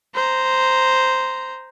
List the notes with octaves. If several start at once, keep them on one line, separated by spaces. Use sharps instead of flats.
C5 A#5